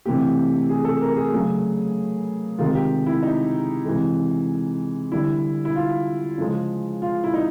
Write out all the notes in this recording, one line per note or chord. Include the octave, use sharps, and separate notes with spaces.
C3 E3 A3 G4
G#4
A4
A#4
G#4
C#3 F#3 A3
C3 D#3 G#3 F4
G4
E4
D#4
C3 E3 G#3
D3 G3 E4
E4
F4
C#3 F3 G#3
F4
E4
D#4